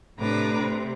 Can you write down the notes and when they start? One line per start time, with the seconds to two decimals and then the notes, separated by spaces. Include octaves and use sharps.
0.18 A2 C3 D4 B4 A#5 D6
0.57 C3